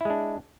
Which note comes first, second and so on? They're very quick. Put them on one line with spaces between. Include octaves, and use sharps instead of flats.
E4 G#3 D4